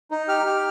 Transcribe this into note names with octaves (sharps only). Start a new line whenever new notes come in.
D#4
G4 F6
G4